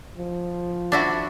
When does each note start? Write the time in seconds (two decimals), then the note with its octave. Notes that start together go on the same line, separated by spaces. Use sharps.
0.18 F3
0.92 D4 E4 F#4